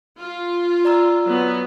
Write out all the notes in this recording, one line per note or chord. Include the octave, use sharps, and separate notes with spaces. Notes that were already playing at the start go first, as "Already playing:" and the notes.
F4
D5 A#5 E6
F#3 B3